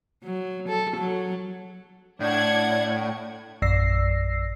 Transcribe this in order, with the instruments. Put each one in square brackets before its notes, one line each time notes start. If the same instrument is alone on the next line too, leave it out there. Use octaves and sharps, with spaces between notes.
[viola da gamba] F#3
A4
F#3
[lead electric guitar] A2 [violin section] D4 F#5 G#6 [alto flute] D5
[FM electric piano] A#1 F#2 D5 E6 A#6 C7